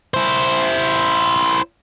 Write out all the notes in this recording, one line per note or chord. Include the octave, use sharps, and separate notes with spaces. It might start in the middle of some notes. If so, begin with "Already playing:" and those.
E4 C5